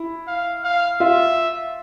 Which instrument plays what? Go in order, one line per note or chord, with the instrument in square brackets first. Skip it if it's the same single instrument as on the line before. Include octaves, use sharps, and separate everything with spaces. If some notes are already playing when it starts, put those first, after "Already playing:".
Already playing: [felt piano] E4
[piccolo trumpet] F5
F5
[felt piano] F4 [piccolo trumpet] E5